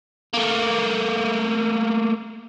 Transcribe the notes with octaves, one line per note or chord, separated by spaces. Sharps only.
A3 A#3